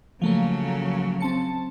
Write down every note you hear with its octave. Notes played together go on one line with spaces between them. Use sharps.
C#3 F3 F#3 A3 A#3
C4 A5 C#7